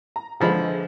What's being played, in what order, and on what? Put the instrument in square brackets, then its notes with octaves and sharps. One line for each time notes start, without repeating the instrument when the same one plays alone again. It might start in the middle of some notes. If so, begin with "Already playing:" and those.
[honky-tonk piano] A#5
[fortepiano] D3 F3 B5 [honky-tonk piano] E3 G#3